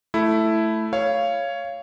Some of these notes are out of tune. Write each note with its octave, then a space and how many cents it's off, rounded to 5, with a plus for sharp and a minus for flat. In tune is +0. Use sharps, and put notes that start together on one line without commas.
A3 +0 E4 +5
C#5 +5 F5 -15